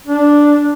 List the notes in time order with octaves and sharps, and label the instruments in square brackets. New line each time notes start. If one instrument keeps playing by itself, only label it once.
[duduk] D4